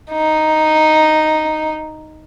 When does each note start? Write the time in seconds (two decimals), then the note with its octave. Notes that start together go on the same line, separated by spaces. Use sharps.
0.11 D#4